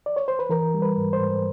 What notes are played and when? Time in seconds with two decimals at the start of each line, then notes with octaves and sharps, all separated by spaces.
0.06 D5
0.16 C#5
0.28 C5
0.39 B4
0.49 E3 A#4
0.74 G3
0.82 B4
0.97 G#2
1.13 C5
1.21 G#2